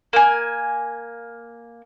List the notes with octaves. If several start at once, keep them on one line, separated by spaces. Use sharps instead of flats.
A#3 G#5